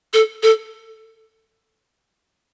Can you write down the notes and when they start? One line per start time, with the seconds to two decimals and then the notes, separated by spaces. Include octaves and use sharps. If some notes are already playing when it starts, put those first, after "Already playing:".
0.13 A4
0.43 A4